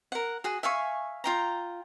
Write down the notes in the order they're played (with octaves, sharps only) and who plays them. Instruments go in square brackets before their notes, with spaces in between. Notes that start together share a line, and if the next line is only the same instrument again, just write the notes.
[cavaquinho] A#4 F#5
F#4 G#4
E5 F5 G#5 C#6
F4 G5 A#5